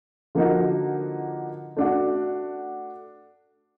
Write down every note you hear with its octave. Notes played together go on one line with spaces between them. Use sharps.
D3 F3 A#3 D#4 F#4
A3 D4 F#4